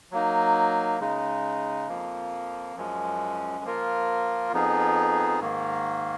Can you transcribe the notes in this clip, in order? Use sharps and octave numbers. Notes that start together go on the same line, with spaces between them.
F#3 A#3 D#4
C#3 G#3 D#4
F2 F3 A#3
F#2 F3 G#3 C#4
F3 A#3 F4 A#4
F2 F3 B3 D#4 G#4
G#2 D#3 A#3